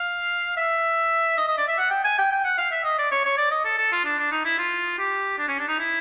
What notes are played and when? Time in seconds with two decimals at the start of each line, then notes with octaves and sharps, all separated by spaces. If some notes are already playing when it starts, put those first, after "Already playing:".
Already playing: F5
0.57 E5
1.38 D#5
1.48 D#5
1.58 D5
1.68 E5
1.78 F#5
1.91 G5
2.05 G#5
2.18 G5
2.32 G5
2.44 F#5
2.58 F5
2.72 E5
2.84 D#5
2.98 D5
3.11 C#5
3.25 C#5
3.38 D5
3.51 D#5
3.65 A4
3.78 A4
3.92 F4
4.05 D4
4.18 D4
4.32 D#4
4.45 E4
4.58 F4
4.98 G4
5.39 D4
5.48 C#4
5.59 D4
5.68 D#4
5.79 E4